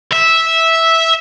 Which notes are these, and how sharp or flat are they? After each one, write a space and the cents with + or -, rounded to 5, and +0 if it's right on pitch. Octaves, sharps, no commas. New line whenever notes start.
E5 -10